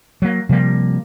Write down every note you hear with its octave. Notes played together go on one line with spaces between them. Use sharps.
F#3 A#3
C3 F3 G3 A#3